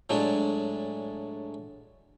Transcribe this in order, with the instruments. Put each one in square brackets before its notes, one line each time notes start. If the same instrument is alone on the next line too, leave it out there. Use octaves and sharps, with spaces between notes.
[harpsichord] A2 F#3 G#3 D4